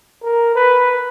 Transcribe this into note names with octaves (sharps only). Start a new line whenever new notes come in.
A#4
B4